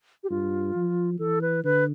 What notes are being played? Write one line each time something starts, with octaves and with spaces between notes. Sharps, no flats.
G4
G2 F4
F3
E3 A4
B4
D3 B4